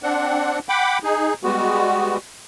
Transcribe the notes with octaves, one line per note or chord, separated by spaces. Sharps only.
C4 D4 F#5
F#5 G5 B5 D6
D#4 G#4
G3 G#3 B3 F#4